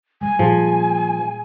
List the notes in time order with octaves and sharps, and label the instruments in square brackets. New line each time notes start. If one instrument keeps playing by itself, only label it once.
[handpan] G3 G#3 [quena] G#5
[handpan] A#2 G#4 [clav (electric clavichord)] F3 [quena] G#5